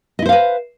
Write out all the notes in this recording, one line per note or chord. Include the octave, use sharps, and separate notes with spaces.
E4 B4 C5 D#5 F5